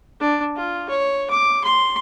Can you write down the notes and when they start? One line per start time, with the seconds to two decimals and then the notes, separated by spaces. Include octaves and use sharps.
0.20 D4
0.56 F4
0.89 C#5
1.30 D6
1.64 C6